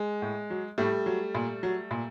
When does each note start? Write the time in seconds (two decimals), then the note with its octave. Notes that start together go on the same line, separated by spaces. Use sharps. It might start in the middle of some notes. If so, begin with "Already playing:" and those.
Already playing: G#3
0.22 A2
0.50 F#3
0.78 A2 G3 A3
1.06 F#3
1.35 A#2
1.63 F#3
1.91 A#2